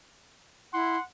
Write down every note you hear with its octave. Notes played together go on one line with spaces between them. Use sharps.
E4 F#5 C6